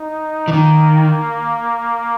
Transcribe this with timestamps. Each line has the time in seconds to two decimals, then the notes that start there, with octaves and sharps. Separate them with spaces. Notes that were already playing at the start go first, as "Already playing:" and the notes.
Already playing: D#4
0.48 E3
0.53 D#3 A#3